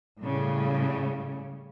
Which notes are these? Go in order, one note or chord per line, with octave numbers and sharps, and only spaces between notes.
A2 C#3 G3